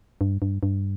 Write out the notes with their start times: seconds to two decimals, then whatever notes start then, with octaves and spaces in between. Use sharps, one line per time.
0.21 G2
0.42 G2
0.63 G2